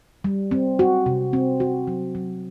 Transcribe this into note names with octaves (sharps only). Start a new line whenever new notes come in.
G3
C4
F#4
C3
C4
F#4
F#3
F#3